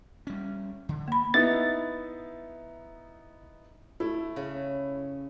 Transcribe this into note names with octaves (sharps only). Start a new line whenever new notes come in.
G3 C#4
D3
A#3 B5
B3 D#4 E4 A6
A3 E4
C#3